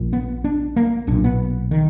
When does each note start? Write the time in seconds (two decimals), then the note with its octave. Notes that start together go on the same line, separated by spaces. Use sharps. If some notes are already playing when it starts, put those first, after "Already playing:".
Already playing: A#1 A#2
0.13 B3
0.44 D4
0.76 A#3
1.07 B1 A#2 D4
1.24 B3
1.71 D#3